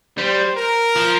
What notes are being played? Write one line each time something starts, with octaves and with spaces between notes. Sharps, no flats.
G3 C5
A#4
F3